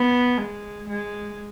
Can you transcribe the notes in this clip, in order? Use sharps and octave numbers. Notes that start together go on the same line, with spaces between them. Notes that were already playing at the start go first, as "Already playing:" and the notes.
Already playing: B3
G#3
G#3